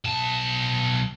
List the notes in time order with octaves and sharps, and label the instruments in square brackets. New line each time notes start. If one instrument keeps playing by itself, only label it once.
[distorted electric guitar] B1 A5